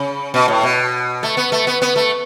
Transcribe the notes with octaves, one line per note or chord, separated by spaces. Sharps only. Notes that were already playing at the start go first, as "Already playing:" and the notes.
Already playing: C#3
B2
A2
B2
A3
B3
A3
B3
B3
A3